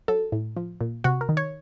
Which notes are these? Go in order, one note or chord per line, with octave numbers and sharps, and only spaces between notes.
F#3 A4
A2
F3
A#2
C3 F#4
A#4
D#3
C#5